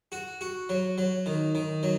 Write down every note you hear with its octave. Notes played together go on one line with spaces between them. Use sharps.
F#4
F#4
F#3
F#3
D#3
D#3
F#3